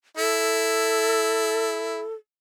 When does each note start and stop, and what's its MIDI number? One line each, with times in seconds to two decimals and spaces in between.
0.17 2.02 64
0.17 2.14 69